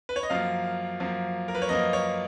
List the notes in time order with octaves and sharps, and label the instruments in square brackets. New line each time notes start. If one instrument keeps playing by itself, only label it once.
[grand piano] B4
C#5
D#5
F#2 F3 A#3 F5
F#2 F3 A#3
A#4
B4
C#5
F#2 F3 A#3 D#5
C#5